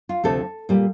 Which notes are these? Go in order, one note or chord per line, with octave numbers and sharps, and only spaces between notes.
F4
D2 C3 F3 A3 A4
A#2 G3